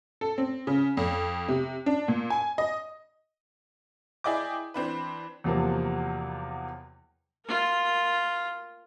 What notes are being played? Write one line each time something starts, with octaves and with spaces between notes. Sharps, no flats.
A4
C4
C#3
F2
C3
D4
A#2
G#5
D#5
E4 G#4 D5 D#5 G5 D6
E3 C4 D4 B4
E2 C3 F3 F#3 A#3
F4 A#4